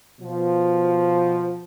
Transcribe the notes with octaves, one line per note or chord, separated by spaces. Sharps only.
B2 F3